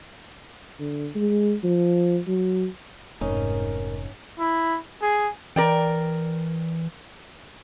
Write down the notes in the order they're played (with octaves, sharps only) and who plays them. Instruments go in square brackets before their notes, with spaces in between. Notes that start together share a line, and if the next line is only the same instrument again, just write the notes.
[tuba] D3
G#3
F3
F#3
[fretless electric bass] F1 [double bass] G#2 [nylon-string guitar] C#4 D#4 [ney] A#4
[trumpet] E4
G#4
[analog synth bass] E3 [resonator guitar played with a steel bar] A#4 D5 G5